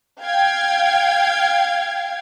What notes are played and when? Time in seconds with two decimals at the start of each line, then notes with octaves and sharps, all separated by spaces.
0.22 F5 G5 G#6